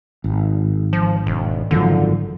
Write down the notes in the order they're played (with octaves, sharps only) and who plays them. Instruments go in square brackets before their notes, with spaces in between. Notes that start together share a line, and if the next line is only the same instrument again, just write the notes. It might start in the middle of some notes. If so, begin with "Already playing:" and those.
[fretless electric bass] G#1
[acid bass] F3
E1
[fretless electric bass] G#1 F#2 F3 [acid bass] D3